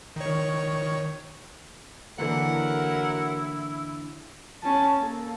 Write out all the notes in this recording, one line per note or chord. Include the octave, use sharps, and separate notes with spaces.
D#3 C#5
D3 E3 F#3 A#3 E4 A#4 F#5
C#4 A5
A#3 A4